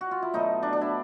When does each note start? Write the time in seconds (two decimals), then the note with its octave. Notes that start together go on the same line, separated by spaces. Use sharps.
0.01 F#4
0.11 F4
0.22 E4
0.33 B2 F#3 A3 D#4
0.63 D4
0.73 D4
0.81 E4